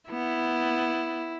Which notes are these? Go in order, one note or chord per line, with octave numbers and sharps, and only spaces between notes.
B3 E4